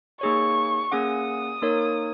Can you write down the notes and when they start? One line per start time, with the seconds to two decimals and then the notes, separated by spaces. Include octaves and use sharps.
0.21 A#3 D#4 G#4 C#5 C#6
0.91 A#3 C#4 G#4 F#5 D#6
1.62 A#3 D#4 A#4 C#5